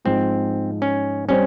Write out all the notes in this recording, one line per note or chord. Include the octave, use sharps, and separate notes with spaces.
G#2 F3 G#3 C4
C#4
G3 C4 C#4